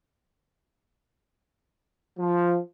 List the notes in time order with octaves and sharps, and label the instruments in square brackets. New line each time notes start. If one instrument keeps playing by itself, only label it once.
[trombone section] F3